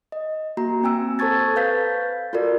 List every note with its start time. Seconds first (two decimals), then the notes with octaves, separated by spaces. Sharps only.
0.12 D#5
0.57 A#3 F#4 A#5
0.83 C4 G5 G#5 E6
1.19 A4 C5 A5 C#6 G#6 A6
1.56 B4 F5 G6 A6 B6
2.33 F4 F#4 A4 A#4 D5